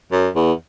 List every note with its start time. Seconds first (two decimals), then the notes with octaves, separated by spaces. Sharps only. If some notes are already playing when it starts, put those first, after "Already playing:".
0.12 F#2
0.35 E2